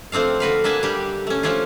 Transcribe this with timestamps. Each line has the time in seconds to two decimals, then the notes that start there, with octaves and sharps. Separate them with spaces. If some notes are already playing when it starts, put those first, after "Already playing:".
0.12 F3 A3 C4 D4 F5
0.40 D3 F#4 B4 F5
0.64 A#3 D4 E5 G#5 A5
0.83 G3 D4 G4
1.27 A3 C#4
1.43 F3 A3 C#4 D4 F4